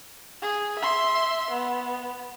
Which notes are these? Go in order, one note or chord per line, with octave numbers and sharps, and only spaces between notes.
G#4
E5 C6
B3